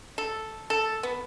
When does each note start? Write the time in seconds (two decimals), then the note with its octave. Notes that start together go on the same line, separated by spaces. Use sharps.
0.18 A4
0.70 A4
1.03 B3